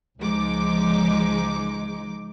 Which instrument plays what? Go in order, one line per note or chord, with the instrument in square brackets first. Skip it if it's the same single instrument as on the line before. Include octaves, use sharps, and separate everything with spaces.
[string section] C#2 F3 G#3 D#4 D6